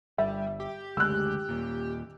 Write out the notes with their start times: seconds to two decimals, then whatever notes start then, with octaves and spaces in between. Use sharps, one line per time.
0.18 G1 G3 E5
0.60 G4
0.97 F#1 D2 G#3 E6 F#6
1.49 D#2 A#2